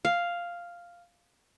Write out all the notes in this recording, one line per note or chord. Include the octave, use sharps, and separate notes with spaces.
F5